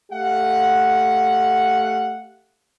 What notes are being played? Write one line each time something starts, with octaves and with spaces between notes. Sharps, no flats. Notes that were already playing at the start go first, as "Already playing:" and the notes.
A3 G4 F5 F#5